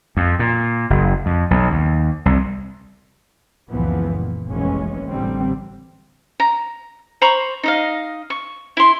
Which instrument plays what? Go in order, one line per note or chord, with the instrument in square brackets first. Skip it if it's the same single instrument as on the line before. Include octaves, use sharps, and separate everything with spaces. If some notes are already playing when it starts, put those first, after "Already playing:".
[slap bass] F2
A#2
F#1
F2
B1
D#2
C2
[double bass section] F#1 C#2 A#2 E3 F3 B3
A#2
F1 A#1 E3 G#3 C#4
A1 D3 G3 C4
[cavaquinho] A#5
C5 A#5 B5 C#6
D#4 D#5 F5
C#6
E4 C6